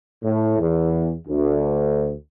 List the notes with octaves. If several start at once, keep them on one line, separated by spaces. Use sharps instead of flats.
A2
E2
D2